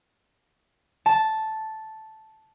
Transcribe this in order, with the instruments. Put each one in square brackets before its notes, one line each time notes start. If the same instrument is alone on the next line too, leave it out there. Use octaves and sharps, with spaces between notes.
[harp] A5